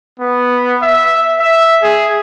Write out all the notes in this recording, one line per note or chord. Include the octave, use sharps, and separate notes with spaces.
B3
E5
E5
G#4